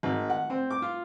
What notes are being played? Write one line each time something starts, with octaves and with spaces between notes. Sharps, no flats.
G#1
F#5
C4
D6
F4